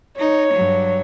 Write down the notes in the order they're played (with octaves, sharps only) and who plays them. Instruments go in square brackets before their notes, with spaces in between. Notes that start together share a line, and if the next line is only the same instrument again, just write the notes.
[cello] D#4 [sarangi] C#5
[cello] G2 F#3